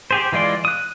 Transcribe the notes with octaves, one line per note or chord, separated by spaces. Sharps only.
G4 G#4 C5
E3 G#3 F4 D5 C6
D#6 F#6